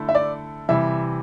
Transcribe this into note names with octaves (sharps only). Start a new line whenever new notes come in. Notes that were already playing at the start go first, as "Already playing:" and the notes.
Already playing: D3 A3 E4 A4
E5
D5
C3 E3 G3 E5